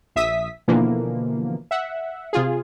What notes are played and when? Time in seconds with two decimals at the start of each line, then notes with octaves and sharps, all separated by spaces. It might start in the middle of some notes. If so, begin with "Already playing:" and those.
0.16 A#1 E5 D#6 B6
0.68 B2 D3 E3 F3 A#3
1.71 E5 F#5
2.33 C3 F4 G#4